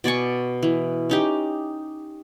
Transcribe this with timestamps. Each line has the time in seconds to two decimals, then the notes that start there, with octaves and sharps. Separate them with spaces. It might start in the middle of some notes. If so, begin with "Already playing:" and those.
0.04 B2 D5 G#5 C#6
0.63 E3
1.10 C#4 D#4 G4